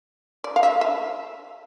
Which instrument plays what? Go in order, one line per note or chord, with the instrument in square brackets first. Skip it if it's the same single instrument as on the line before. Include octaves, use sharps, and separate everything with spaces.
[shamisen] D5
F5
E5
E5